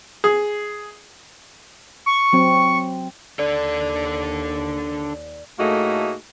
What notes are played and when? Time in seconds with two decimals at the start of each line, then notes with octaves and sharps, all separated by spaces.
0.24 G#4
2.06 C#6
2.33 F#3 C4
3.39 D#2 D4 A4 D5
5.59 A2 A3 A#3 D#4 F#4 G#4